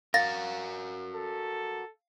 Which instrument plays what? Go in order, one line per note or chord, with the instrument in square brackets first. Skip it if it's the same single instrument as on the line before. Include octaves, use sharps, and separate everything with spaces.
[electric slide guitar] F#4 A#4 [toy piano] F5 [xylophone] A6 A#6
[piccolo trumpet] A4